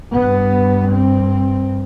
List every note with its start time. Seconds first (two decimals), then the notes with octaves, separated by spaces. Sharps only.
0.15 G2 B3
0.94 C4